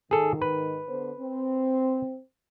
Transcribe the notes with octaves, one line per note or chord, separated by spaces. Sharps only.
G#2 D#3 G#4 A4
B4
D3 B3 C5
C4